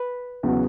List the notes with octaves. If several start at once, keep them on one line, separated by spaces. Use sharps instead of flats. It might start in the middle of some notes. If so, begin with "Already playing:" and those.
Already playing: B4
E2 C#3 F#3 B3 F#4